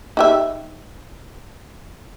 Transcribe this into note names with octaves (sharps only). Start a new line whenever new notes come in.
D#4 G4 E5